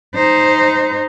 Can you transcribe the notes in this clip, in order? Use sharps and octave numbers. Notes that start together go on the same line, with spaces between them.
D#4 C5